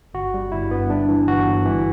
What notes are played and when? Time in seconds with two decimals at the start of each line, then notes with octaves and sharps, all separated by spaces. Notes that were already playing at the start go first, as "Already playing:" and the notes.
0.14 G1 F#4
0.34 G3
0.52 G1 E4
0.71 G2 B3
0.90 G2 D4
1.08 E3
1.28 G1 F#4
1.47 G1
1.66 E3